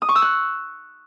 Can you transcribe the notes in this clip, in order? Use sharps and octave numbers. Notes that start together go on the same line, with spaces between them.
D#6
C#6
E6
F#6